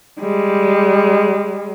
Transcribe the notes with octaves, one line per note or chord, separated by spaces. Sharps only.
G3 G#3